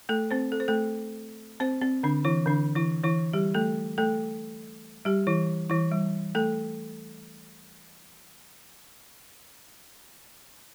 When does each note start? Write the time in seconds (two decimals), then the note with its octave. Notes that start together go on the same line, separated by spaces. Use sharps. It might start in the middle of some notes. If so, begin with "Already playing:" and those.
0.09 A3 A4
0.31 C4 C5
0.52 A4
0.60 C5
0.68 A3 A4
1.60 C4 C5
1.81 C4
2.03 D3 D4
2.25 E3 E4
2.46 D3 D4
2.75 E3 E4
3.04 E3 E4
3.33 G3 G4
3.55 A3 A4
3.98 A3 A4
5.05 G3 G4
5.27 E3 E4
5.70 E3 E4
5.92 G3
6.35 A3 A4